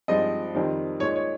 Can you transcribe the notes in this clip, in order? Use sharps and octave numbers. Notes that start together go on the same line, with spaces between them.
G2 F3 G#3 C4 D#4 D#5
F2 D#3 G3 C4 D#4
A#2 G#3 D#4 C#5
C#5